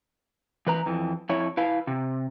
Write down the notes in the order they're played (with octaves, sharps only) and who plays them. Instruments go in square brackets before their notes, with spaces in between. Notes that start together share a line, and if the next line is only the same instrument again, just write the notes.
[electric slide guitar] E3 B4 A#5
F2 E3
F2 E4 C#5
E4 B4 F5
C3